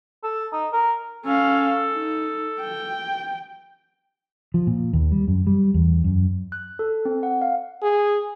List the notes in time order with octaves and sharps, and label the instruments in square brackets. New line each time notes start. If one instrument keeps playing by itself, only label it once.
[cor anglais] A4
D#4
A#4
[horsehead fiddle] C#4 F5 [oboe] A4
[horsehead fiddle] D#4
G5
[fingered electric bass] F3
A#2
D#2
G3
F#2
G3
E2
F#2
[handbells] F#6
A4
C4
F#5
F5
[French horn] G#4